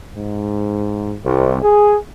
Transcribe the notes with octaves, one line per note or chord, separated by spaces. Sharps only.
G#2
C2
G#4